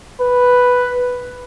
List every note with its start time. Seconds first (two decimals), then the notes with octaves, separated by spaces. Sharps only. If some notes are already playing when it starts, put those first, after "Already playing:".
0.21 B4